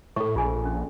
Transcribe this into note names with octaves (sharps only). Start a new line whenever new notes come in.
A2 A4 C#6
A#1 F4 G#4 G#5
C#4